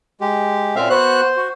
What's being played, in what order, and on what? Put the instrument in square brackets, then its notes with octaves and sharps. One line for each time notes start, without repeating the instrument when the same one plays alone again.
[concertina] G#3 G4
[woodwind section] F#2 A#2 [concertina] C4 E5 F5
[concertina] B3 F#4 F#6 [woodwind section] C5
[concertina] F#4